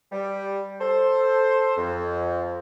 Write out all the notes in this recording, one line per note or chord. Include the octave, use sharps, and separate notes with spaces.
G3
A4 C5
F2